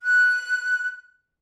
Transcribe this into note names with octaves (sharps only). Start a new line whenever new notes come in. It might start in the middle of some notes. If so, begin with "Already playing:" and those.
F#6